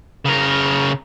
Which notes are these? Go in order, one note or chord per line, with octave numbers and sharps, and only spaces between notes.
C#3 A#4